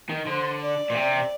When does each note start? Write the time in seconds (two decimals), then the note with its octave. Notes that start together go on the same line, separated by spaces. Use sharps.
0.09 D#3
0.26 D3 C5
0.60 D5
0.90 A#2
0.95 C3